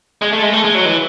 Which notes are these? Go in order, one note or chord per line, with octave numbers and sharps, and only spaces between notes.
G#3
A3
G#3
A3
G#3
F#3
E3